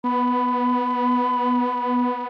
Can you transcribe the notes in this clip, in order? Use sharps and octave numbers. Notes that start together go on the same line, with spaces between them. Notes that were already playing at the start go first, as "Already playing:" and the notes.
B3 B5